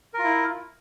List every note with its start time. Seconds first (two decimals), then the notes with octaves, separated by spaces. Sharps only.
0.14 A#4
0.19 F4
0.24 E4